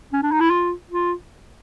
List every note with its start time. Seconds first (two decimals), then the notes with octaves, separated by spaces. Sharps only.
0.13 C#4
0.23 D4
0.32 D#4
0.40 E4
0.51 F4
0.91 F4